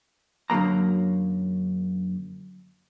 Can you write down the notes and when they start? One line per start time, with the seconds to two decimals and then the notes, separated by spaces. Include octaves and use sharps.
0.50 F#2 D3 F#3 A#3 A#5